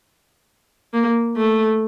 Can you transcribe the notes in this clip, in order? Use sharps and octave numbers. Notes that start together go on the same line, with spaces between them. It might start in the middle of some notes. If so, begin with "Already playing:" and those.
A#3
A3